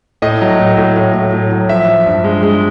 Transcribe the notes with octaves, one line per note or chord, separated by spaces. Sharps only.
A2 D#5
F#3
A2
A2
A2
A2
A2
F#3
F3 E5
F3
G2
G#3
G#3